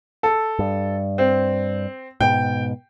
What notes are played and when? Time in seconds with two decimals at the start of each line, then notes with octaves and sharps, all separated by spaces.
0.23 A4
0.59 G2
1.18 C4
2.21 G#2 B2 G5